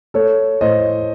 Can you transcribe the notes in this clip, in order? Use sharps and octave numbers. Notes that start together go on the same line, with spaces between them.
A3 A4 C#5
A2 C5 D#5